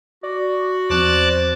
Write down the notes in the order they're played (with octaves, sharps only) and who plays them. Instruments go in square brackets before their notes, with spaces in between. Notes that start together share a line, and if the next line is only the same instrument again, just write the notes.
[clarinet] F#4 [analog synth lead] D5
[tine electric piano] E2 F3 C4 [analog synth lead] C5 [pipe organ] D5 A5 F#6